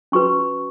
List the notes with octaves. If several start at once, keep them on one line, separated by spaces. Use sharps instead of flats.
C#4 F#4 B4 C#6